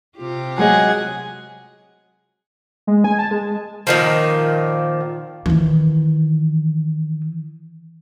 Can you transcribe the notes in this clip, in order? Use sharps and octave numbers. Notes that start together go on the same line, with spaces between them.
C3 F4 G4
F#3 G#3 G#4 D#5 F#5
G#3
G#5
A5
G#3
A#2 D#3 F3
D#3 E3